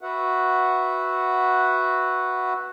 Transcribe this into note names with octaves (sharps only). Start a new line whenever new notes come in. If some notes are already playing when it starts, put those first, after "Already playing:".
F#4 B4 E5 F#5